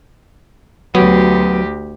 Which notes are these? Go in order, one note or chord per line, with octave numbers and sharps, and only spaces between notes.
D2 F#3 B3 G4